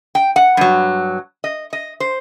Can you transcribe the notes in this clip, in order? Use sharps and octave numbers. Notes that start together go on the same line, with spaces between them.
G5
F#5
G2 F#3
D#5
D#5
C5